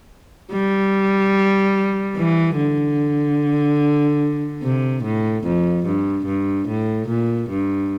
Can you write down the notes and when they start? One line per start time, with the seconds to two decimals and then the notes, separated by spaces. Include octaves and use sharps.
0.52 G3
2.17 E3
2.57 D3
4.63 C3
5.03 A2
5.44 F2
5.86 G2
6.26 G2
6.68 A2
7.08 A#2
7.50 G2